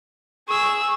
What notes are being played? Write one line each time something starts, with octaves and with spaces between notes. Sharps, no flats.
G#4 C#6 E6